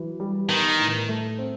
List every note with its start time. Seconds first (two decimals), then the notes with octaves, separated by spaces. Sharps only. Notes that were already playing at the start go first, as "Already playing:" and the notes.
Already playing: E3 F#3
0.20 G3
0.49 D#3 B3
0.80 A2
1.08 A3
1.38 C4